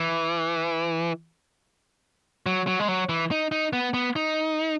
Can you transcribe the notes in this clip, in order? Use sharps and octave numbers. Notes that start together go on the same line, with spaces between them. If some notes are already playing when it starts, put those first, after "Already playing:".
Already playing: E3
F#3
F#3
G#3
F#3
E3
D#4
D#4
B3
B3
D#4